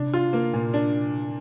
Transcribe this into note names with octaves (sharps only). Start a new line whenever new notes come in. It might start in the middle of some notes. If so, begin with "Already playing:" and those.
Already playing: C3 D4
F4
A#3
A#2
D4